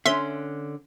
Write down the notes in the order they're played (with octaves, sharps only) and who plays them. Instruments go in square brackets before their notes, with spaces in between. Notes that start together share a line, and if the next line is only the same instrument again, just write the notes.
[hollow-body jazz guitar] D3 C#4 [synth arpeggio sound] E5 C6